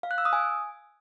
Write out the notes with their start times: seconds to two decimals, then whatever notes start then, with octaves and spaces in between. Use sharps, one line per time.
0.03 F5
0.11 F#6
0.18 E6
0.25 D#6
0.33 G#5